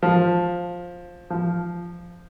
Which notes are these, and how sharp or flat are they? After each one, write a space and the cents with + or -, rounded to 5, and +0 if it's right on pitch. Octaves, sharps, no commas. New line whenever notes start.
F3 +10
F3 -5